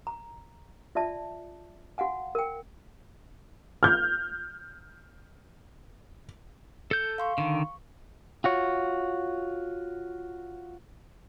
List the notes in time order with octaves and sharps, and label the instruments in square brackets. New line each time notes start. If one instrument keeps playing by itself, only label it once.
[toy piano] A#5
F4 D5 E5 A5
F#4 F5 F#5 G#5
A#4 G5
[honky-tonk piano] F6 G6
[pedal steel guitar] A4 G6
[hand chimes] F5 C6 C#6
[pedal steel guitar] D3 D#3 [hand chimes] C#6
[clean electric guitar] F4 F#4 C#5